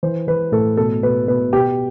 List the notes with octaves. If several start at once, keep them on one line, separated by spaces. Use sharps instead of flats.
E3 C5
E3 B4
A2 A4
B2 A4
B2 B4
B2 B4
B2 G4